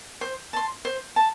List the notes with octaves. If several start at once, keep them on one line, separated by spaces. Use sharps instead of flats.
C5
A5 C6
C5
A5